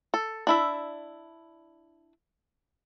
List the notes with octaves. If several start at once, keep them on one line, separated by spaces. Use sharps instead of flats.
A4
D4 E4 E5